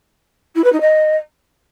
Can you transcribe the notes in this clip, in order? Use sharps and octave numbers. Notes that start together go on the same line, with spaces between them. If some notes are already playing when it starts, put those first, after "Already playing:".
E4
B4
D#4
D#5